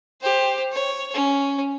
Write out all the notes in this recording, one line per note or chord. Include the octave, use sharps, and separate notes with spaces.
G4 C5
C#5
C#4